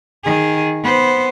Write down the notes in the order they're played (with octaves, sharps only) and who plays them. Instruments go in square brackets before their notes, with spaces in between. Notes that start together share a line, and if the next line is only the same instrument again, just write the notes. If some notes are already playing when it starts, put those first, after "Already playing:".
[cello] D#3 G#4
B3 C5